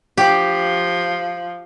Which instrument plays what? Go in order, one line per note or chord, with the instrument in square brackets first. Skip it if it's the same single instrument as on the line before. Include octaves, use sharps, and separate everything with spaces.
[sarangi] F3 [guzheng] G4